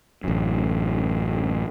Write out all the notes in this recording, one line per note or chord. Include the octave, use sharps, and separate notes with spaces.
A1 F#2